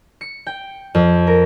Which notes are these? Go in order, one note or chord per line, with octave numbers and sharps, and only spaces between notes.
C#7
G5
F2
A#4